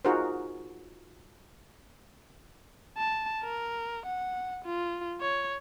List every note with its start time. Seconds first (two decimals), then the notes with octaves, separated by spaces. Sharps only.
0.05 D#4 F4 F#4 G#4 A#4 C5
2.97 A5
3.44 A#4
4.06 F#5
4.65 F4
5.21 C#5